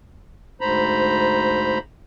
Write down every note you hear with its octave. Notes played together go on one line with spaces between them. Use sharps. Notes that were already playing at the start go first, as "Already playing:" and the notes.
D2 G#2 C5 A#5 B5